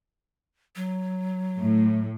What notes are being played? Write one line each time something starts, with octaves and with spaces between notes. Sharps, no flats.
F#3
A2